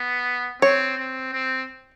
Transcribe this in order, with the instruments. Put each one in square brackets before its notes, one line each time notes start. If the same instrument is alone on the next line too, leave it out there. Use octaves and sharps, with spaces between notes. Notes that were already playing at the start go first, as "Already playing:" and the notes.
Already playing: [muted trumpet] B3
[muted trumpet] C4 [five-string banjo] C#5
[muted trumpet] C4
C4